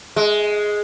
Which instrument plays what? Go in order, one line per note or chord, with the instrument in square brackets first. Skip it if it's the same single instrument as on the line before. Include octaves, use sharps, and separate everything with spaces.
[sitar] G#3